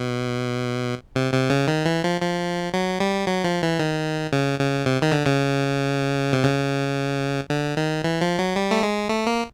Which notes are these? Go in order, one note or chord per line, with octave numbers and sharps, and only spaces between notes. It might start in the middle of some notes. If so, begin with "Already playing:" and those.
Already playing: B2
C3
C3
C#3
D#3
E3
F3
F3
F#3
G3
F#3
F3
E3
D#3
C#3
C#3
C3
D#3
D3
C#3
C3
C#3
D3
D#3
E3
F3
F#3
G3
A3
G#3
A3
A#3